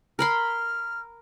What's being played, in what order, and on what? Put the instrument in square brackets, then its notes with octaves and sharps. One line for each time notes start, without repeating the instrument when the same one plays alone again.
[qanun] A#4 B5 C6 [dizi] F6